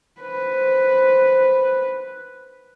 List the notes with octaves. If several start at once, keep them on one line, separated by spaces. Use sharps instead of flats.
B4 C5